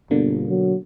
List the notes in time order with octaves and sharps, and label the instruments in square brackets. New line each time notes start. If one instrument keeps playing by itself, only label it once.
[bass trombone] G1 [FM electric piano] B2 D3 A#3
[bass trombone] F#3